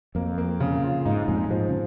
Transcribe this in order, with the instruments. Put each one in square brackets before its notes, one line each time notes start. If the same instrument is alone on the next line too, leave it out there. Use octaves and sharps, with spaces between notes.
[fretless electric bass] F2 [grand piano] A#3
[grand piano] A#3
C#3
F4
[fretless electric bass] G#2 [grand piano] D#4
[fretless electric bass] F2 A#2 [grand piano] G#3
[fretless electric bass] G#2 [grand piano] F3
[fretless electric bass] C#3